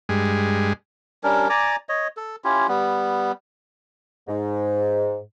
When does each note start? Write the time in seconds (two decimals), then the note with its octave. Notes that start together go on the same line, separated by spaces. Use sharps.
0.09 G2 G#3
1.24 G3 C#4 D4 A#4
1.50 D5 G#5 A#5 D6
1.89 C#5 D#5
2.17 A4
2.44 C#4 E4 F4 G4
2.68 G3 B3
4.28 G#2